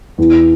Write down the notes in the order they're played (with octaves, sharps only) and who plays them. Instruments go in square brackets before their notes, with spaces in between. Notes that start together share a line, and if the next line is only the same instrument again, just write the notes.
[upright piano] E2